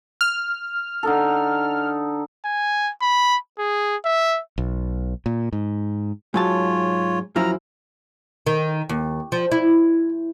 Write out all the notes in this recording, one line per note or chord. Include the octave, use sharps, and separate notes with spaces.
F6
D3 D#4 A4
G#5
B5
G#4
E5
B1
A#2
G#2
G#2 F#3 F4 C#5 A5
F#2 F3 E4 A#5 F6
D#3
D#2
F3
E4